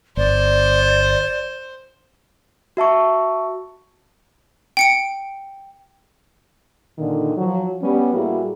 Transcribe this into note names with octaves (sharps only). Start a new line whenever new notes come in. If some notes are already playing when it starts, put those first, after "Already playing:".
G1 C5 D5
F#4 E5 A5 C#6
G5 C#7 D7
A#2 D3 D#3
F3 F#3
G3 B3 C#4
A2 G3 A#3 E4 F#4 G#4